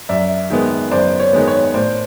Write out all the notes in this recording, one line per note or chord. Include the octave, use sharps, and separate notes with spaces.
F#2 D5 E5
D#3 G#3 B3
F#2 C5 D5
C#5
D#3 G#3 B3
C#5
A2 C5 D5